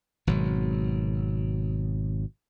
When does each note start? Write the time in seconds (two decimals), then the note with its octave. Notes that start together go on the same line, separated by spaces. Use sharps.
0.27 G#1 B2 F#3